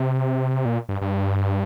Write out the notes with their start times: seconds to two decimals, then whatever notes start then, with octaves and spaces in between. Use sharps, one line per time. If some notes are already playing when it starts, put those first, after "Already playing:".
Already playing: C3
0.65 A#2
0.89 G2
1.02 G2